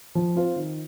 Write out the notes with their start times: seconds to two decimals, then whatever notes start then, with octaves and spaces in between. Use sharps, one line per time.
0.15 F3
0.36 C4 F4 C5
0.56 D#3